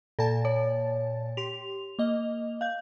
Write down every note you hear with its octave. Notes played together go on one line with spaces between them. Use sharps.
A#2 A4 A5 A6
C#5
G4 C6 F7
A#3 D#5
F5 G6